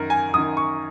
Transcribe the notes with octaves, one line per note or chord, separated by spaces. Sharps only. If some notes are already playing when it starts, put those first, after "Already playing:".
Already playing: F#2 D#3 A#4
G#5
F#2 D#3 D#6
C#6